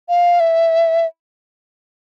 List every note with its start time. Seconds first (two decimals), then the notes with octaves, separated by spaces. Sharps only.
0.09 F5
0.40 E5